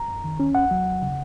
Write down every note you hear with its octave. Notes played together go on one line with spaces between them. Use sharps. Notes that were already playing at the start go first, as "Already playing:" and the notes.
Already playing: A#5
F#2
D#3
C#4
D#2 F#5
F#3
D#2
C#3